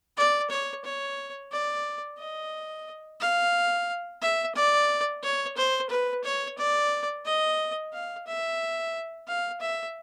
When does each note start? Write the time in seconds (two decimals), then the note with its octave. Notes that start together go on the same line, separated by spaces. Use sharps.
0.17 D5
0.50 C#5
0.84 C#5
1.52 D5
2.19 D#5
3.20 F5
4.22 E5
4.55 D5
5.23 C#5
5.57 C5
5.90 B4
6.24 C#5
6.58 D5
7.25 D#5
7.93 F5
8.27 E5
9.28 F5
9.61 E5